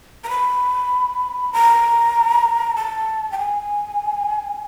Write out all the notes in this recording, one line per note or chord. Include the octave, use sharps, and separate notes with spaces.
A#5
B5
A#5
A5
G5
G#5